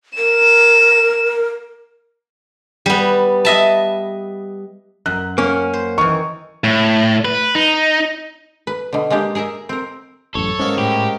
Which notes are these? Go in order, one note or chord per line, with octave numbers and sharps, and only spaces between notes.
A#4 E7
G3 B3
D#5 E5 A5
F#2 F#6
A#3 C#4
C5
D#3 E3 C#6
A2
B4
D#4
B4
B2 D3
G#3 A#3 D4 G4
G#4 A#4 D#5 E5
C4 A#4
A1 F#2 A4 C#5
G#2 A#3 C#4
A2 G4